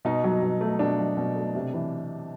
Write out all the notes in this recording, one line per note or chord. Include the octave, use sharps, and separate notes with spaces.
B2 D#4
F#3
B2
A3
B2 D4
F#3
B2
A3
C3
E3